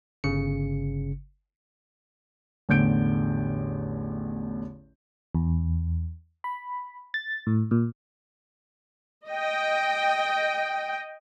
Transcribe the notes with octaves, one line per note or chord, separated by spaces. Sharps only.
G1 C#3 C#7
A1 E2 D3 G6 D7
E2
B5
A6
A2
A#2
D#5 G5